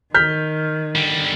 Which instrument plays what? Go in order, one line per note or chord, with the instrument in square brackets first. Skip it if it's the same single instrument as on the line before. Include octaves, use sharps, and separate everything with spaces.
[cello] D#3 [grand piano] F6 G6 B6
[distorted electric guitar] D3 G3